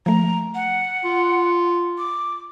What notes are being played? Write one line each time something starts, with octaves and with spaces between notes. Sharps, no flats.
F3 A3 A#5
F#5
F4
D6